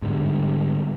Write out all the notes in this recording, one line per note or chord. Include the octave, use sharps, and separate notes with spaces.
G#2 D3 G3